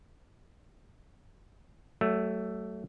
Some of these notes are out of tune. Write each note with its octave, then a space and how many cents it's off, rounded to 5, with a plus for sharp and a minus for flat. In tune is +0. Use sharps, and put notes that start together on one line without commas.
F#3 +35 A3 +0